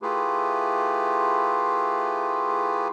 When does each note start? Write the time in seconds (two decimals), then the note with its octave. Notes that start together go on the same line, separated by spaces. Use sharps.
0.02 A3 E4 F4 G4 G#4 B4